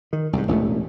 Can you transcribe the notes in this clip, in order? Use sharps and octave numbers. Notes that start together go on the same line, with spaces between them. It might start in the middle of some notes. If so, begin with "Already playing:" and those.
D#3
C2 G#2
E1 A1 D#2 A3